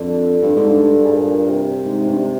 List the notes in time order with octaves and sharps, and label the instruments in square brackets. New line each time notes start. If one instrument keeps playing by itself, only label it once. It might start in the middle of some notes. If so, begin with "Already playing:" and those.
Already playing: [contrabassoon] F2 [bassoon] D3
[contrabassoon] G2
G#2
G2
[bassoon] G#2
A#2
C3
[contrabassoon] G#2
G2